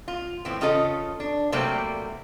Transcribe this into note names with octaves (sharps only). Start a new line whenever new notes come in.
F4
A2 E3 C4
C#3 C#4 F4 A4 D#5
D4
C3 F#3 G3 A3 A#3 C4